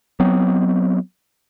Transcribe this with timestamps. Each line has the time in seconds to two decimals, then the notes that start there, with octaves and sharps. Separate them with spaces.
0.20 F#3 B3 C4